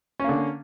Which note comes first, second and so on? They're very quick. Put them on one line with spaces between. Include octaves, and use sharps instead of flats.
C#4 A#3 D3